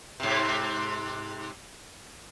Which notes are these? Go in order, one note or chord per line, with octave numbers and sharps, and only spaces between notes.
G#2 C3